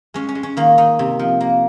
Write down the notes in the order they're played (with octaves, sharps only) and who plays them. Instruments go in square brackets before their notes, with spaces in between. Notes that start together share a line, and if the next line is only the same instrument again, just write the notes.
[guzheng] G#3 C#4
C#4
G#3
C#4
D#3 A#3
D#3 D#4
C3
F3
A#3